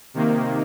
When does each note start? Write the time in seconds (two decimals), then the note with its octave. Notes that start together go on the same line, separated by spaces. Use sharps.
0.14 C3 D#3 A#3